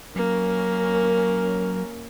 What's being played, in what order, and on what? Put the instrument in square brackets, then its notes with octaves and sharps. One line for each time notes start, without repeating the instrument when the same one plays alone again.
[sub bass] F#3 [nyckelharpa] A#3 [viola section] C#4 A#4